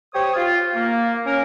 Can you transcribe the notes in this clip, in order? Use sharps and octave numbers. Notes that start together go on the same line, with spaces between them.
G4 C5 C#5 D#6
F4
A#3
C#4 A#4